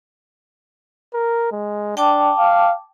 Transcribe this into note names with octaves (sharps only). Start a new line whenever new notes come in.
A#4
G#3
D4 G5 A5 D6
F5